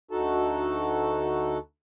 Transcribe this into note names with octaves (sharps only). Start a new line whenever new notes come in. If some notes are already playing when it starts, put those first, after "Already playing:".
D2 D#4 F#4 A4 A5